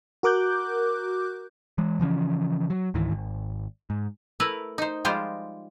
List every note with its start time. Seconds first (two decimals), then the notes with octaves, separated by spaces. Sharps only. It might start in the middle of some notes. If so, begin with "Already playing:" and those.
0.23 F#4 A#4 D6 F#6 G6
1.78 E3 G#3
2.00 C#3 E3 F3 C#4
2.70 F#3
2.94 C#2 G#2 D#3 E3
3.12 G#1
3.90 G#2
4.40 A3 E4 A#4 B4
4.78 D#4 C5
5.05 F3 G3 G#3 F4 G4 C5